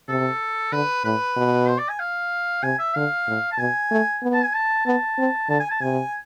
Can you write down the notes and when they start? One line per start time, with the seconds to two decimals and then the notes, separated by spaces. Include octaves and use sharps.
0.08 C3 A4
0.72 D3 B4
1.04 A2 B4
1.36 B2
1.68 C5
1.79 D5
1.89 G#5
2.00 F5
2.63 C3 G#5
2.79 E5
2.95 D3 F5
3.27 A2
3.52 A5
3.58 B2 G#5
3.91 A3
4.22 B3
4.33 A5
4.44 G#5
4.55 A5
4.86 B3 A5
5.18 C4
5.49 D3 A5
5.60 G#5
5.71 A5
5.81 C3 G#5